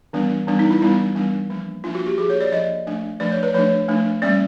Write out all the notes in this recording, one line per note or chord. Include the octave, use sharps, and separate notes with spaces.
E3 G3 B3 D4
E3 G3 B3 D4
D#4
E4
E3 G3 B3 D4 E4
E3 G3 B3 D4
F3 A#3 D4
F3 A#3 D4 F4
F#4
G4
F3 A#3 D4 G#4
C#5
D5
F3 A#3 D4 D#5
F3 A3 D4
F3 A3 D4 D5
C#5
B4
F3 A3 D4 C#5
F3 A3 D4
G3 A#3 C#4 D5